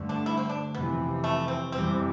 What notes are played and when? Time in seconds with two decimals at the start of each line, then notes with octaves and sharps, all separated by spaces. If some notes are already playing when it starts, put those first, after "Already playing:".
Already playing: G2 D3 A3
0.09 D4
0.26 E4
0.37 C4
0.49 D4
0.75 F2 C3 E3 B3
1.24 A3
1.48 C4
1.72 F2 C3 E3 G3 C4